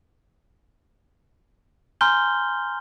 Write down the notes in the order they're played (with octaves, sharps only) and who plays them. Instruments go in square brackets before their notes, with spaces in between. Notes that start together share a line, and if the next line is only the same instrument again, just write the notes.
[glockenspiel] G#5 A#5 C6 F6 G6 G7